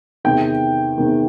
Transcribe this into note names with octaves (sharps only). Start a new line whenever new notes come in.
E2 C3 D#3 G5
E2 C3 D#3